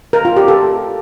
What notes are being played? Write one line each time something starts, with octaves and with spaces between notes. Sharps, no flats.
A#4
F4
G4
A4